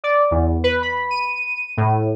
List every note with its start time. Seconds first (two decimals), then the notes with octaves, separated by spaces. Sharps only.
0.04 D5
0.31 E2
0.64 B4
0.82 B5
1.11 D#7
1.77 A2